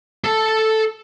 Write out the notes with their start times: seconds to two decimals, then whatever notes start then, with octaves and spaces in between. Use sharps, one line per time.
0.24 A4 A5